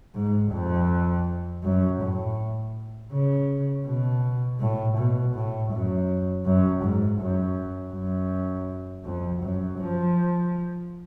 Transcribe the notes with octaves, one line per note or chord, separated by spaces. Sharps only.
G#2
F2
F#2
A2
C#3
B2
A2
B2
A2
F#2
F#2
G#2
F#2
F#2
F2
F#2
F3